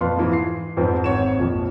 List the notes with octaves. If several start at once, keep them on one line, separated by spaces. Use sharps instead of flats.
F2 A#2 B4 F5 A5 C6
G#2 E3 F3
C7
F2 G#2 F3 B3 C4
G#1 G#2 C4 C#5 F#5 E7
A#1 F2 F3